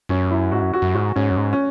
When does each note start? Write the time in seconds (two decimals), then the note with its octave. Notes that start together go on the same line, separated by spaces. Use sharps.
0.09 F#2 C#4
0.30 E4
0.52 G#2 F#4
0.62 F#2
0.73 F#4
0.82 F#2
0.95 G#2 F#4
1.16 G#2 C#4
1.31 F#2
1.37 G#2
1.53 C#4